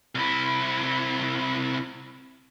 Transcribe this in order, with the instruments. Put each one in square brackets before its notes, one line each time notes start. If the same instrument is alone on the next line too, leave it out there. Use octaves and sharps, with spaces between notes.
[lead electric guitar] C2 E4